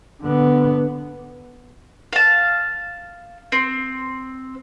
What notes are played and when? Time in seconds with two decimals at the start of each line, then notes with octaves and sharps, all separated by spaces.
0.22 D3 B3
2.13 F5 A5
3.52 C4